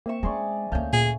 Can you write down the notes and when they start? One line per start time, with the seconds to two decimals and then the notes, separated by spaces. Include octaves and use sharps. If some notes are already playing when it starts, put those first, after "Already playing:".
0.06 A#3 C4 E5 C#6 E7
0.23 G#3 C#4 G#4 D5 A#5 C6 C#6
0.72 D2 A3 A#3 C#4 F5 A5 F6 G6
0.93 A#2 G#4